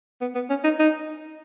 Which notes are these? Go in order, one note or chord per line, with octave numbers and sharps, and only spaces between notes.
B3
B3
C#4
D#4
D#4